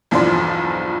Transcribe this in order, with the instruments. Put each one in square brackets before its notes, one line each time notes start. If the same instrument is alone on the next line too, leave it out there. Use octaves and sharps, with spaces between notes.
[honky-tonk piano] B1 E2 G2 F3 D5 C6